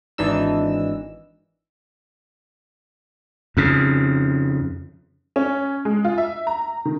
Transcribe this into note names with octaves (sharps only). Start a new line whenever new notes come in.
G#1 E3 D4 D#4 E6
F2 C#3
C#4
G#3
F4
E5
A#5
D#3